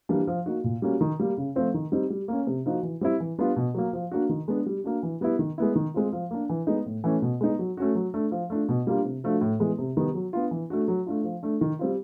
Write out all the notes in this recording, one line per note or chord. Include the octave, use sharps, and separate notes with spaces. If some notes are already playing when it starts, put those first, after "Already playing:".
E3 G3 A#3 D4
F3
A#3 D#4 F#4
A#2
G3 A#3 C#4 F#4
D#3
G3 A#3
C#3
F3 A3 C4 F4
D#3
G3 C4 D#4
G3
A#3 C#4
C3
F3 A#3 D#4 F#4
E3
G3 C4 E4
E3
G3 B3 D4 F4
B2
F#3 A#3
F3
A#3 D4 F#4
D#3
G#3 B3 D4
G3
A#3 D4 F#4
E3
G3 B3 E4
D#3
G#3 B3 E4
D#3
G#3 C4 F4
F3
A#3 D4
E3
G#3 B3 D#4
A2
E3 A3 C#4
B2
G#3 B3 D#4
F#3
A3 C#4 F#4
F#3
A3 D4
F3
A3 D4 F4
B2
G3 A#3 D4 F4
C3
F3 A3 D4 F#4
A2
E3 G#3 B3
C3
D#3 G3 B3
F#3
B3 D4 F4
E3
A3 D4 F#4
F#3
A3 D4 F4
F3
A3 D4
D#3
G3 C4 F4